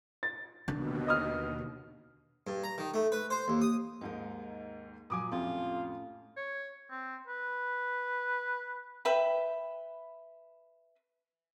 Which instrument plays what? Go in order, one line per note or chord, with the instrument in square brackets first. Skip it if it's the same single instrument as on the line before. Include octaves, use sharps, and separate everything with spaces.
[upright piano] A6
[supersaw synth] D#2 B2 [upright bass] D3
[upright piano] D#5 D#6 F6
[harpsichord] G2
A#5
D#3
A3
B4
C5
D#2
D#6
[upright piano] D#2 G#2 [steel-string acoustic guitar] D#4 A#4
[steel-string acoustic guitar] A#2 F#3 [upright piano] G#5 D6 D#6
[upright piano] C2 F2 [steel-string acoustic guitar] A2 C#4 [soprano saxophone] F4
[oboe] C#5
C4
B4
[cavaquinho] B4 E5 G5 B5